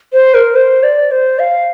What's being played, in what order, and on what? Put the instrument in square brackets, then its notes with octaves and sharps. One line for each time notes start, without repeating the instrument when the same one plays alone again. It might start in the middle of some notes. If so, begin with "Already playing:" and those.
[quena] C5
A#4
C5
D5
C5
F5